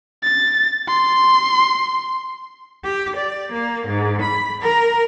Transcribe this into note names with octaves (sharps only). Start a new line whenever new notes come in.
A6
C6
G4
D5
A#3
G#2
B5
A#4